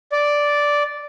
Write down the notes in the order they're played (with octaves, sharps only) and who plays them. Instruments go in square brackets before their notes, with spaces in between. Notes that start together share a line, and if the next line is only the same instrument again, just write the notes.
[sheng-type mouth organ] D5